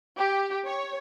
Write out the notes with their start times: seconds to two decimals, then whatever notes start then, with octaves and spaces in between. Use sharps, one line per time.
0.17 G4
0.67 C#5